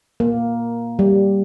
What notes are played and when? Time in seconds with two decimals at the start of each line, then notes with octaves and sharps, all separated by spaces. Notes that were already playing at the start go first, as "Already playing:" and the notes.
0.20 A#3
0.99 G3